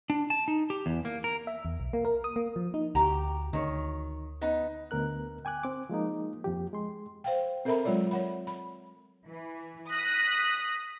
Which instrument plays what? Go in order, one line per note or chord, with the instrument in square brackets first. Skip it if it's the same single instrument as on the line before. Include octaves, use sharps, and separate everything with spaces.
[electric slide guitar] D4
A5
D#4
G4
E2
A#3
A#4
[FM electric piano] E5
E2
B1
A#3
A#4
D#6
A#3
F3
D#4
[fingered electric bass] D2 [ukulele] F#4 A#5 [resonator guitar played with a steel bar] G4
[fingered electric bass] D2 [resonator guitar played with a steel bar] D#3 C#5
[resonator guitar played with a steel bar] B3 D#4
[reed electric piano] D2 B3 A#4 F#6
G5 G#5 D6 F#6
C4 D6
F3 G#3 A#3 D#4
F2 F3 G4
G#3 C6
[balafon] C5 F5 G5
C4 A4 A#4 E5 A#5 B5
F#3 G#3 F4 C#5 D5
C#5 F#5 B5
B5
[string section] E3
D#6 F#6 A#6 B6